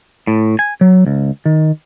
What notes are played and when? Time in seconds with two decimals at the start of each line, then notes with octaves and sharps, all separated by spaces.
0.27 A2
0.59 G#5
0.81 F#3
1.06 C#2
1.46 D#3